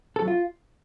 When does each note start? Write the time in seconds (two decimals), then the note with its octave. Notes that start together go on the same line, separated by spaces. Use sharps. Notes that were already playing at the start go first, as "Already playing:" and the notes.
0.16 A4
0.22 F#3
0.28 F4